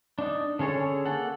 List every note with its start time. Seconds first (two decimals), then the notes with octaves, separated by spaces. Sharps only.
0.19 D4 D#4
0.59 D3 C#4 G#4 A4 C#5
1.06 A#3 A4 F#5